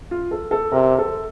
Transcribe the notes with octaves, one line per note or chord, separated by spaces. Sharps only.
F4
A4
A4
C3 A#4
A4